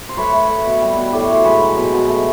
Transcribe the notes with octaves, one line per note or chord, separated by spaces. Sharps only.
C5
A3 B4 C#5
A3
A3
B2
G3
B2
A2 D5
C#5
A2 C5
G#3 B4 C#5
F#3
B2
B2
A3